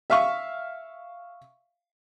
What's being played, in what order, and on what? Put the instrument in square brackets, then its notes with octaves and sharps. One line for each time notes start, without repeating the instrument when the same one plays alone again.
[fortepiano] E5 F5 C#6